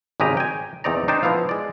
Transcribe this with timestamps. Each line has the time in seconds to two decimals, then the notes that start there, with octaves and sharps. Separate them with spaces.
0.20 G#1 C#3 G#3 G4 D#5 A#5
0.37 G5 G#5
0.84 E2 C4 D#4 D5 A#5
1.08 D4 D#4 C5 G5 A5
1.23 F3 B3 E4 F5
1.49 G#3 D5